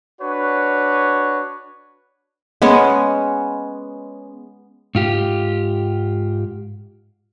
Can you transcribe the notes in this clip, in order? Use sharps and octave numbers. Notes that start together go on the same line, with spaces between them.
D4 F#4 B4 C#5
G#3 B3 C#4
G#2 F4 G4